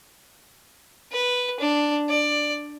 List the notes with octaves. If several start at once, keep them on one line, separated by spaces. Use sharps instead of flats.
B4
D4
D5